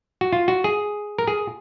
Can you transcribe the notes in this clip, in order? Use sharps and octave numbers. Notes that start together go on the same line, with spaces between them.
F#4
F4
F#4
G#4
A#4
G#4